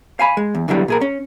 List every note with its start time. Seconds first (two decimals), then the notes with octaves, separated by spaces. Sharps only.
0.19 F5 G#5 B5
0.37 G#3
0.55 E2
0.68 E2 D3 E3 F#3 G3
0.88 A#2 G#4 A#4
1.01 C#4